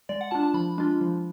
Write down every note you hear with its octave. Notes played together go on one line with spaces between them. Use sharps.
G#3 D5
F#5
D4 F4 A5
A5
F3 B5
G#3 D4 F4
F3